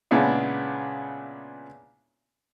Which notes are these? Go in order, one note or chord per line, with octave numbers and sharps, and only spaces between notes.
A#2 C#3 G#3 B3 D4 E4